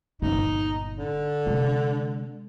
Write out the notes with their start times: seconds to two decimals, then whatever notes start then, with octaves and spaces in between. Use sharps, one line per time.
0.22 G1 A#2 D#4
0.98 D3
1.46 C3 G#3